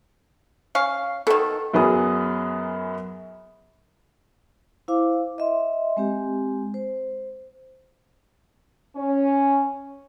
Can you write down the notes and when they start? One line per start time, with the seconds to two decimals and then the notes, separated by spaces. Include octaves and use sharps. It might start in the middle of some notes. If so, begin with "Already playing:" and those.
0.75 C#4 F5
1.27 B2 D#3 A4
1.74 F#2 F#3 B3 G#4 D#6
4.88 E4 C5 F5 D6
5.38 D#5 E5 C6
5.97 G#3 C4 G4
6.74 C5
8.97 C#4